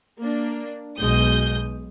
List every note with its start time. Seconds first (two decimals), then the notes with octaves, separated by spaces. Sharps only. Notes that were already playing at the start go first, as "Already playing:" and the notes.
0.18 A#3 D4
0.99 B1 B2 G#3 D#6 G6